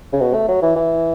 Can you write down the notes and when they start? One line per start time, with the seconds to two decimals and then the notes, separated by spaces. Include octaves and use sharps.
0.13 C#3
0.21 B2
0.34 A3
0.48 F#3
0.62 E3
0.76 E3